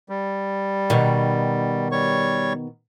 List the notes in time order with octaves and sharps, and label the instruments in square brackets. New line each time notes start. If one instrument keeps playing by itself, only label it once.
[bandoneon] G3
[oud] B2 D#3
[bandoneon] G3 C#5 C#6